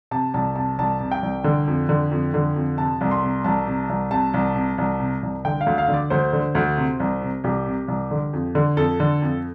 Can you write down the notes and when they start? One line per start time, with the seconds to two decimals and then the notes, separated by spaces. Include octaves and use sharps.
0.11 C3 A5
0.34 C2 A5
0.56 C3 A5
0.78 C2 A5
1.00 C3
1.12 G5
1.23 C2
1.44 D3
1.68 F2
1.89 D3
2.11 F2
2.34 D3
2.56 F2
2.78 C3 A5
3.01 C2
3.11 C6
3.23 C3
3.44 C2 A5
3.67 C3
3.89 C2
4.11 C3 A5
4.34 C2
4.55 C3
4.78 C2
5.00 C3
5.23 C2
5.45 D3 G5
5.61 F5
5.66 D2
5.78 F5
5.88 D3
5.94 D5
6.10 D2 C5
6.33 D3
6.55 D2
6.77 C3
7.00 C2
7.22 C3
7.44 C2 G4
7.67 C3
7.88 C2
8.11 D3
8.33 F2
8.55 D3
8.77 F2 A4
9.00 D3
9.22 F2